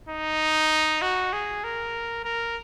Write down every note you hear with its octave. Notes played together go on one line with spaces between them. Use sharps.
D#4
F#4
G#4
A#4
A#4